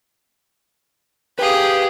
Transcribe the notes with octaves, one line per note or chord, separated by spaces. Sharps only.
G4 G#4 B4 F5